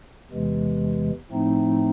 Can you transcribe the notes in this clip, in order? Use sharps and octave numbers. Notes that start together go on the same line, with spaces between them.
E2 C3 E3 G#3
A2 F3 A3 C4 D#4